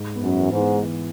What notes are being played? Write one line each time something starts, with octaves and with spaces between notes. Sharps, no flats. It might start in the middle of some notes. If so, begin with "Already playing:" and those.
Already playing: G#2
B3
F#2
E3
G#2
B3
E3